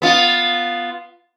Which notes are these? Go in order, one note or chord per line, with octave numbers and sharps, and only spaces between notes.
B3 F4